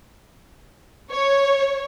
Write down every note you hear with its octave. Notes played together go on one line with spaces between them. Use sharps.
C#5